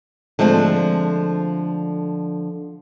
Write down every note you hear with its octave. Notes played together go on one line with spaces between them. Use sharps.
D3 F3 G#3 A3 C4